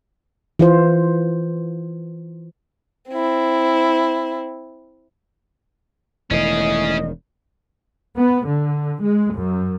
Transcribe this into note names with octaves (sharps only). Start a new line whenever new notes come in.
E3 F4 C5
C4 E4
E1 A2 D#3 C#4 G#4 D#5
B3
D3
G#3
F#2